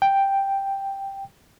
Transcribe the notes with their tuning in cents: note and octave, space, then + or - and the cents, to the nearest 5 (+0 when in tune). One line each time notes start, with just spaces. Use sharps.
G5 +0